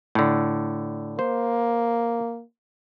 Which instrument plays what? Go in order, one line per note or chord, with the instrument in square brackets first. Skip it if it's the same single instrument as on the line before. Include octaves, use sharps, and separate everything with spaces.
[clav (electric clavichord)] A2 D3
[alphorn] A#3 [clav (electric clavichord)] C5